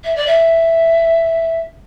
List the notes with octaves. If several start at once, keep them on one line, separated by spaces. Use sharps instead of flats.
E5
D5
E5